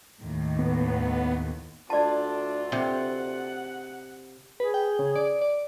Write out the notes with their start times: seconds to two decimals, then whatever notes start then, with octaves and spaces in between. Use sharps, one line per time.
0.22 D#2 A2 D#3
0.59 B3
1.90 D2 D4 F4 D5 A5
2.72 C3 F#5
4.60 G#4 B4
4.74 G5
4.99 C#3
5.16 D5
5.41 D5